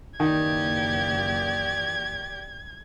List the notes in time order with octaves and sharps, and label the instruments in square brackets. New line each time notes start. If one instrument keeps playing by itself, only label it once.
[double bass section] F#1 E3 A#3 [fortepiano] D#3 [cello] G4 D5 [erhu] G#6